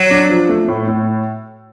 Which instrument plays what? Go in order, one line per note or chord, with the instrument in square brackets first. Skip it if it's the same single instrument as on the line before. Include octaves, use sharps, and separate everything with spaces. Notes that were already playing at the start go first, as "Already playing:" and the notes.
Already playing: [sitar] F#3
[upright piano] D4
F3
A3
A2
A2